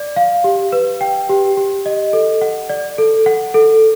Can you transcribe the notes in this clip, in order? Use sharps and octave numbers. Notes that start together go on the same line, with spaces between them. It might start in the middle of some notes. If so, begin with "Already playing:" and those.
Already playing: D5
F5
G4
B4
G5
G4
G4
D#5
A4
F#5
D5
A4
F#5
A4